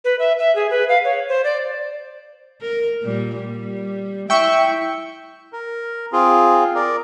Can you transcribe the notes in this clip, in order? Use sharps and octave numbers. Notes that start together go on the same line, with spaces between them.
B4
E5
E5
G#4
B4
F5
C#5
C5
D5
A#4
A#2 G3
G3
E4 E5 G5 C#6
A#4
C4 F4 G#4
A#4 D5